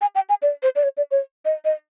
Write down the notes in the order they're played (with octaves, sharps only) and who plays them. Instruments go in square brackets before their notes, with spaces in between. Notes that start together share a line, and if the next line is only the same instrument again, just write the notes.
[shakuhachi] G#5
G5
G#5
D5
C5
D5
C#5
D5
C#5
D#5
D#5